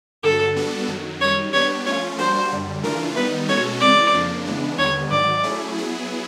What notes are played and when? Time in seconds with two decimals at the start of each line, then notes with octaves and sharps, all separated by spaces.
0.23 G2 D3 F#3 A4
0.56 G3 B3 D4 F#4 A4
0.88 F#2 D#3 F#3
1.21 F#2 D#3 G3 C#5
1.53 G3 B3 D4 G4 C#5
1.86 F3 A3 C#4 F4 C#5
2.18 G3 A#3 D4 F#4 C5
2.51 F#2 D3 G3
2.83 C#3 E3 A3 D4 F4 A#4
3.16 D#3 G3 B3 D#4 B4
3.48 B2 G#3 C#4 F#4 A4 C#5
3.80 C#3 E3 G#3 C4 D5
4.13 F2 C#3 F3 A#3 D4
4.46 C#3 E3 G#3 B3 D4
4.78 D#2 D3 G3 B3 C#5
5.11 G#2 D#3 F#3 D5
5.43 F#3 A3 C#4 E4 G#4
5.75 F#3 B3 E4 G#4